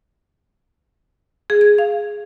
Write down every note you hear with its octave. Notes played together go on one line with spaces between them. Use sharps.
G#4
G#6
F5